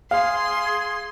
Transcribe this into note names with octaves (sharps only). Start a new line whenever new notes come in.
G#4 F5 C6